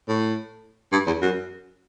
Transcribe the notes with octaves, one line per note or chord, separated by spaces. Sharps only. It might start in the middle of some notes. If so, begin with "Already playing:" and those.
A2
G2
E2
F#2